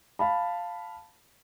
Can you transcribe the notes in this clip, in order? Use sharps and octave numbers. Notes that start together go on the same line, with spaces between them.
F5 A5 B5